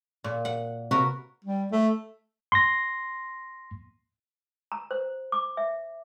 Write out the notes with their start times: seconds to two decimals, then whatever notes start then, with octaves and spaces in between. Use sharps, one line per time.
0.24 A#2
0.45 F#5
0.91 C3 F#4 A#4 B4
1.45 G3
1.71 A3
2.52 C6 A#6
4.72 A#5
4.91 C5
5.32 D6
5.57 E5